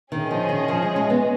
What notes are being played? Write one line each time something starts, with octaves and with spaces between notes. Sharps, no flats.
D#3 C#4 G#4 D#5
F3
D#3
F3
G#3
G#3
B3